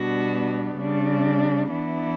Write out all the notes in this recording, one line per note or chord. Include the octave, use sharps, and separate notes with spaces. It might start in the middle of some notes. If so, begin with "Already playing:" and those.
Already playing: B2 G3 B3 D4 F#4
C#3 G3 D4
E3 B3 D4 E4